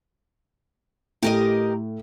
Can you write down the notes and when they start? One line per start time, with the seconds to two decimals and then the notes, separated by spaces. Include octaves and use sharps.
1.23 A2 G4 A#4 D#5